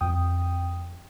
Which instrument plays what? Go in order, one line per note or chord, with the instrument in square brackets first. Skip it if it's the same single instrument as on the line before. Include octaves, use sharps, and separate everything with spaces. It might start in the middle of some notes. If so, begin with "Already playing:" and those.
[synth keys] F2 G5 D#6